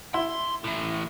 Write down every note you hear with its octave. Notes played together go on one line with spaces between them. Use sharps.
E4 C6
A2 E3